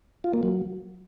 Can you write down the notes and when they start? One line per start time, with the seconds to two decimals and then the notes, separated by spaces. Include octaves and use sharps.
0.24 F4
0.33 A#3
0.43 F#3